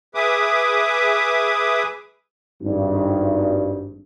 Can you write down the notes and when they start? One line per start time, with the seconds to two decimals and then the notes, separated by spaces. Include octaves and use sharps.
0.15 G#4 B4 E5 D6 D#6
2.62 G#1 G2